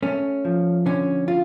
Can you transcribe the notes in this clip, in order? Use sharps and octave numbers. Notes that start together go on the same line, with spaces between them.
A3 C#4
F3
D3 C#4
F4